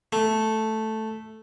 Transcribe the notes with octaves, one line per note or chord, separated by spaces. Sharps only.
A3